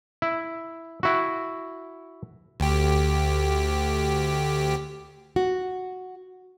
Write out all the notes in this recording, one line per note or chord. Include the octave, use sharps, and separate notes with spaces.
E4
E4 F#4
D2 G4
F#4